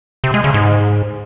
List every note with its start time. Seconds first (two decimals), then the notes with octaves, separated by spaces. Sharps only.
0.24 C3
0.34 G#3
0.44 C#3
0.54 G#2